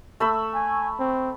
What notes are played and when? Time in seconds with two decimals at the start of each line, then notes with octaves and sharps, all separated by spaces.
0.20 A3 B5 E6
0.55 G#5
0.99 C4